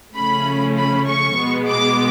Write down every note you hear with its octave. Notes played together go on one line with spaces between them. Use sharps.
C#3 F3 A3 C#4 B5
B5
C#6
B2 G#3 B3
D6